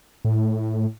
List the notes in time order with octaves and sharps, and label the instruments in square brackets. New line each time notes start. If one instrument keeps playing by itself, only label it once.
[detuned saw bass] A2